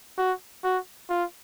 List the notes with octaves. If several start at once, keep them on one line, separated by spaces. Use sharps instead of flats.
F#4
F#4
F4